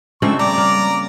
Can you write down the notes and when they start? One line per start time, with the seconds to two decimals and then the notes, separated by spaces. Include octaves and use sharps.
0.22 C#3 F3 G#3 A3 C4 D4 C#6
0.39 G3 D5 A#5 D6
0.58 A#3